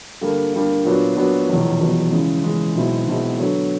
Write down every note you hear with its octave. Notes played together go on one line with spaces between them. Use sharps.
G2 D3 G3 A#3
G2 D3 G3 A#3
A#2 F#3 B3 D4 F#4
A#2 F#3 B3 D4 F#4
F1 E2 B2 F#3
F1 E2 B2 F#3
C#3 E3 G#3
C#3 E3 G#3
B1 B2 G#3 C4 E4
B1 B2 G#3 C4 E4
D3 F#3 B3